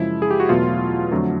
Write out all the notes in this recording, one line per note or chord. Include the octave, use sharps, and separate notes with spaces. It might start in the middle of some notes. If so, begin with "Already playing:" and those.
Already playing: F#2 C#3 F3 G#3 E4
G#4
G4
F#4
E2 B2 F#3 A3 F4
F2 D3 F#3 A3